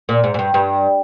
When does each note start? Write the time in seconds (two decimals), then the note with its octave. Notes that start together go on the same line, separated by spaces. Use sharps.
0.09 A#2
0.24 G#2
0.34 G#2
0.39 G2
0.54 G2